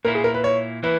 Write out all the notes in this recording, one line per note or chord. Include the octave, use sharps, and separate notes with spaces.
A#2 A#3 E4 A#4
G#4
A#4
B4
C#5
E3 A#3 E4 B4